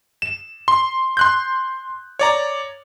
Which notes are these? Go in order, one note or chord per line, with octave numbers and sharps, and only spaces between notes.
E7
C6
C6 F#6 G6
C#5 D5 A#5